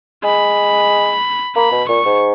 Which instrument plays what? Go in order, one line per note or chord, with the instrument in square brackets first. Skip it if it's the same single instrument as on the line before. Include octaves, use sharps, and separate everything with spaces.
[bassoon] G#3 [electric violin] B5
[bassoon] A#3 [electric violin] B5
[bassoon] B2
[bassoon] A#2 [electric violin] C#6
[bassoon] G#2